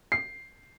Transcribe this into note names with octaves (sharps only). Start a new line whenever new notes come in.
C7